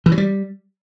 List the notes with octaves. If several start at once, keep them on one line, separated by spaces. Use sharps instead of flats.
E3
F#3
G3